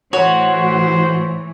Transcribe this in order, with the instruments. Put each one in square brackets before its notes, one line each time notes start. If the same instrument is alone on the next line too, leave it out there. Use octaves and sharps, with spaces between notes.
[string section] A2 E3 [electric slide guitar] F#4 [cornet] C5 [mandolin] C#5